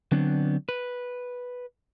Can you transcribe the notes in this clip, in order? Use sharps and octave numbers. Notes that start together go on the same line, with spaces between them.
D3 F#3 B3 C4 D4
B4